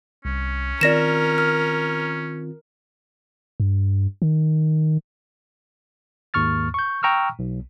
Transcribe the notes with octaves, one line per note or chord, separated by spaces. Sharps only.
C2 C#4
D#3 C4 F4 A#4 D5 A#6 E7
F6
G2
D#3
D#2 G#2 C#6 F6 A6
C#6 G6
G5 A#5 C#6 E6 F6
B1